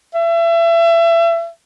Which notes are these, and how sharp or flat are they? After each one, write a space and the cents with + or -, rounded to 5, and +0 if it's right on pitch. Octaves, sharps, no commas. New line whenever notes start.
E5 +30